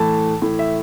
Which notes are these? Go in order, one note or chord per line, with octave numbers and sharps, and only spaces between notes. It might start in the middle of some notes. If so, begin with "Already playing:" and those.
Already playing: A2 E3 A3 A5
A2 E3 A3
E5